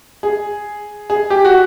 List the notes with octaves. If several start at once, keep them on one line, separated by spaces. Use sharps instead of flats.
G#4
G#4
G4
F#4